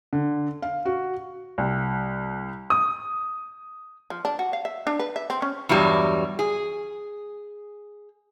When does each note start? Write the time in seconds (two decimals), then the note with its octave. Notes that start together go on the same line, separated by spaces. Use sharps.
0.13 D3
0.62 F5
0.85 F#4
1.58 C2
2.70 D#6
4.10 F3
4.25 D4
4.39 F#4
4.53 F5
4.65 E5
4.87 D4
4.99 B4
5.16 E5
5.30 C4
5.42 C#4
5.69 E2 G2 F#3 G3
6.39 G#4